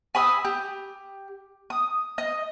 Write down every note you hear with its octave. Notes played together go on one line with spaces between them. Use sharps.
G#5 B5 D#6 E6
G4
D#6
D#5